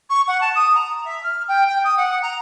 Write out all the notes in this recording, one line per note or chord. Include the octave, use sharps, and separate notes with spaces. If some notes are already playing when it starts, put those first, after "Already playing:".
C#6
F#5
A5
D#6
A#5
E5
F6
G5
G5
D#6
F#5
A#5